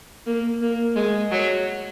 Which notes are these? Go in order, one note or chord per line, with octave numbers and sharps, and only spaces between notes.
A#3
A#3
G#3
F#3